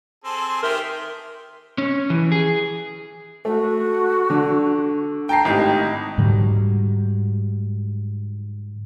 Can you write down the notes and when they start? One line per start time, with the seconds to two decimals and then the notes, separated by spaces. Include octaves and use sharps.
0.24 C4 G#4 A4 C6
0.63 D#3 G4 A#4 C5 E5
1.78 C#4
2.10 E3
2.32 G#4
3.45 A3 F#4
4.30 D3
5.29 G5 A5 A#5 C7
5.45 G#1 A2 D#4 G4
6.18 G#2 D3 F#3 G3